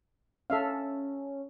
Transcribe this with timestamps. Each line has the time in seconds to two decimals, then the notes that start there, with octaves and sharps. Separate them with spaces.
0.50 C#4 A4 E5 F5